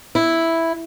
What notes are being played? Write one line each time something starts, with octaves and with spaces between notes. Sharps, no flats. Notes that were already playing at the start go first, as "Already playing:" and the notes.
E4